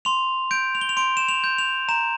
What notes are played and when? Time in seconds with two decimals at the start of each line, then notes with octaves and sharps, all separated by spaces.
0.05 C6 F7
0.51 G6 D7
0.75 F7
0.81 G7
0.89 F7
0.97 C6 D7
1.17 E7
1.29 F7
1.44 G6
1.58 F7
1.89 A#5 E7